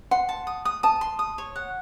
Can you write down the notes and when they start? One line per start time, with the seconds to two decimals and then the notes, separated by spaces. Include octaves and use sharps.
0.11 F#5 C6
0.29 A5
0.47 D#6
0.65 D#6
0.83 A5 D#6
1.01 C6
1.19 D#6
1.38 C#5
1.56 F#5